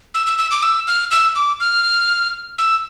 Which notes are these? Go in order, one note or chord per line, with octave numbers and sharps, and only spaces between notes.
E6
E6
E6
D6
E6
F6
E6
D6
F6
E6